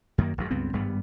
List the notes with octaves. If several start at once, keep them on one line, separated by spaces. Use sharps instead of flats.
F#2 D#3 A#3
G#1 F#2 F#3
C#2 G2 B3 C4
G#1 G2 G3 B3